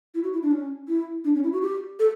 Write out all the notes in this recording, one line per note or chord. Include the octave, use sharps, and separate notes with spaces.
E4
F#4
E4
D4
C#4
E4
D4
C#4
E4
F#4
G4
A4